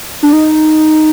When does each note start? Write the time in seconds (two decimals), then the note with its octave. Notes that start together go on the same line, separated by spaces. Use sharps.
0.23 D4
0.33 D#4